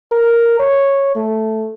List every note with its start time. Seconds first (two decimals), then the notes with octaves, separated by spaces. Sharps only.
0.12 A#4
0.59 C#5
1.15 A3